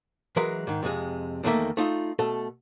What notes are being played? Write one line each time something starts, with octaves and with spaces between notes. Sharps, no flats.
E3 F#3 G#3 A#4 B4 E5
G#2 D#3
F2 C3 G#3
E2 D#3 F#3 A3 A#3 E5
A3 D#4 F4
B2 A3 A4